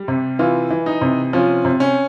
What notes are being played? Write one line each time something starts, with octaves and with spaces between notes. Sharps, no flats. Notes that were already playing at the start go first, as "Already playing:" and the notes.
Already playing: G3
C3
E3 F4
E3
D#4
C3
F3 C#4
C3
C#4